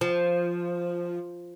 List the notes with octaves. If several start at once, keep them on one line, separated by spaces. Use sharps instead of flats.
F3